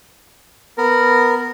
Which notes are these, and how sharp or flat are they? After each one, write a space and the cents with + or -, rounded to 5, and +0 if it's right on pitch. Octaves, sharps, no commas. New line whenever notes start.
B3 +0 A#4 -10